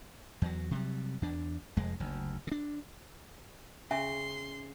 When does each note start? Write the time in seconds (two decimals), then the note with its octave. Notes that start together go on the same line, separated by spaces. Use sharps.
0.42 E2 F#3
0.71 C3 F#3 G3
1.22 E2 D4
1.76 F1 F2 G#3
2.00 F#1 D2
2.47 C#3 D4
3.91 C#3 C#4 E5 G#5 C6